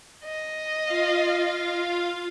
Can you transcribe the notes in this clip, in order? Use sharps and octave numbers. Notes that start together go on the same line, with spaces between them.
D#5
F4 F5